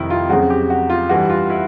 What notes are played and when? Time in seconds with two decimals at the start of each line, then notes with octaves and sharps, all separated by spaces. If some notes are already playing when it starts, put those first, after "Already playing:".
Already playing: F2 C3 D#3 G3 E4
0.10 F4
0.30 F2 C#3 F#3 F#4
0.50 G4
0.70 F#4
0.90 F4
1.09 G2 E3 G3 F#4
1.30 F4
1.50 E4